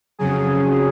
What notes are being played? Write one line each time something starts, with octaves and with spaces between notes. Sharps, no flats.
F2 C#3 F#3 G#4